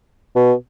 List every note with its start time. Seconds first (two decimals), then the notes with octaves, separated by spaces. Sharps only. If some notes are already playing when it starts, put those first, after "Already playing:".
0.35 B2